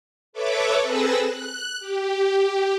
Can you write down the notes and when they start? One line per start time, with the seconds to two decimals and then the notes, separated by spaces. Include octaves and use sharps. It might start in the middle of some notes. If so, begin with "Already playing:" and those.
0.33 A4 B4 C#5 E5 D6
0.82 C4 G#4 A4 B4 E6 A#6
1.26 F#6
1.80 G4